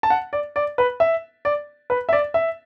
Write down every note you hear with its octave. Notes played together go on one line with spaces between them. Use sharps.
A5
F#5
D5
D5
B4
E5
D5
B4
E5
D5
E5